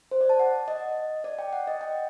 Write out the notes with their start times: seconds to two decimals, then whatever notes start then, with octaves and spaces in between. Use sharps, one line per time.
0.11 C5
0.21 D5
0.29 A5
0.40 F#5
0.68 D#5
1.24 D5
1.39 G5
1.53 F#5
1.67 D#5
1.81 G5